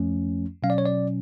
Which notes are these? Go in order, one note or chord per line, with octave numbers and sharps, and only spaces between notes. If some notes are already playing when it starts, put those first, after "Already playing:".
Already playing: F2 F3 A3 C#4
B2 F#3 C#4 F5
D5
C#5
D5